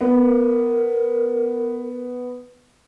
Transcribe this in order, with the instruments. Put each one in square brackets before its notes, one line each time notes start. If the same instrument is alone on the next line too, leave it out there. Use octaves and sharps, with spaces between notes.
[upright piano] B3 [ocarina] A#4